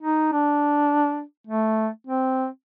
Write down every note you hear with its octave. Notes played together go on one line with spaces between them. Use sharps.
D#4
D4
A3
C4